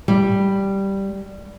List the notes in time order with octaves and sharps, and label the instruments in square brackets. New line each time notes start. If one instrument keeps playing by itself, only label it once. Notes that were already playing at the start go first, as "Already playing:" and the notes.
[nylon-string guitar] G3